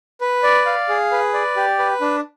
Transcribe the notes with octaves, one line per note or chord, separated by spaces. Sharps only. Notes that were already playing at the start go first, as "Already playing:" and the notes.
B4
D5
F5
G#4
B4
D5
G4
B4
D4